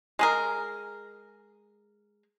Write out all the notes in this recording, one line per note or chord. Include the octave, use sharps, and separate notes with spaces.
G#3 G#4 A#4